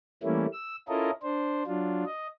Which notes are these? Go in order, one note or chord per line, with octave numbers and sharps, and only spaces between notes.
E3 G3 A3 A#3 C#4 E4
E6
C#4 E4 F4 A4 A#4 D#5
D4 C5
F#3 D4 F4
D#5